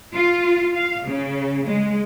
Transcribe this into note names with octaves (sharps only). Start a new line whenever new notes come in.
F4
F5
C#3
G#3